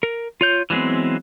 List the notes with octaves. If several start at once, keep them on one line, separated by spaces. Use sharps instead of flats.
A#4
F4 C#5 G6
E3 F#3 G#3 B3 C4